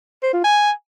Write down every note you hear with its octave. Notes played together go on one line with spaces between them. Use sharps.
C5
F4
G#5